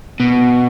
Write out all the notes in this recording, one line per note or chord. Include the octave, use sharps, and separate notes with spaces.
B2